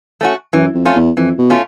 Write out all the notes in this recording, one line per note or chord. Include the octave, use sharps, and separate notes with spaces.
A3 C#4 F#4
F#2 E3
F2
A3 C#4 F4
E2
F2 E3
B2
A3 C#4 F4